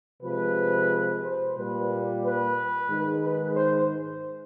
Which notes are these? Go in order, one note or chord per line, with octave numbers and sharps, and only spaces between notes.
C3 F3 G#3 B4
C5
A#2 G3 A#3 B4
B4
G#2 D#3 G#3
B4
C5